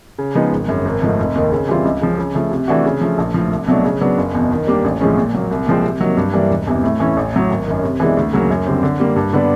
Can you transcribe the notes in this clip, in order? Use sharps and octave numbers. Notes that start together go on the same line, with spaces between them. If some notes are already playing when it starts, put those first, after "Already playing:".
C#3
F3 G#3 B3 D#4
G#1
F#2 C#3
G#1
G#2 F3 A3
F1
D#2 D#3
C#3
E3 G3 C4 F4
C#2
C#3 F3
C#3
F3 A3
C3
E3 A3 D4 F#4
C#3
F3 A3
A#1
A2 F3
C2
B2 F#3 A3 D4
C#3
F#3 B3 D4
F#1
E2 B2
D#3
G3 A#3 D4 G4
A1
A2 F3 G#3 C#4
A#2
F#3 A#3
C2
A#2 F3 G#3 C4
C3
D#3 F#3 A#3
G2
E3 G3 A#3 D4
E1
E2 C3 E3
A2
E3 A3 C#4 E4
A1
A2 F#3
G#1
F#2 D#3
C3
E3 G#3 B3 D4
D2
C#3 F#3 A#3
F#2
D3 G3 C4
D3
G3 A#3
G2
D3 G3 B3 D4